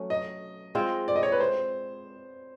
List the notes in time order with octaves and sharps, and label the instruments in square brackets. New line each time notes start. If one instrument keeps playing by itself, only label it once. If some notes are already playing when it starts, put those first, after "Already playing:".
Already playing: [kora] F#3 A3 C#4
[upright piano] D#5
[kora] G#3 C4 F4
[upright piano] D5
D#5
C#5
B4
C5